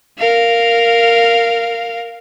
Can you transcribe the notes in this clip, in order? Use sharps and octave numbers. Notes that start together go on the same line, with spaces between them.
A#4 F5